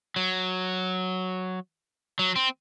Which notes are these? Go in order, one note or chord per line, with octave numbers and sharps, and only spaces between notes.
F#3
F#3
C4